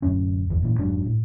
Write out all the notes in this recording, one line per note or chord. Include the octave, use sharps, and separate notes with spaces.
D1 F#2 C#4
G1 E2
A#2 E3
F1 G#2 F#3 D4
A2